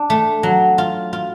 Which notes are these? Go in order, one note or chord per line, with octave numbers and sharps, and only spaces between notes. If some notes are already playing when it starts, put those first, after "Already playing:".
Already playing: D4
A3
F#3
F4
F4